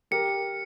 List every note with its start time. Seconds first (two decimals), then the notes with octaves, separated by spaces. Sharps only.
0.11 G4 A#4 C#7